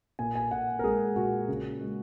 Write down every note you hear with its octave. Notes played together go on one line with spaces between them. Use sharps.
A#2 G#5
G#5
A#2 F#5
A#4
G#3 G#4
A#2 F#4
C#3
G#3